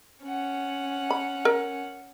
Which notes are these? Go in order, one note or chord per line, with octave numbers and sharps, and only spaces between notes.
C#4 F#5
B5
A#4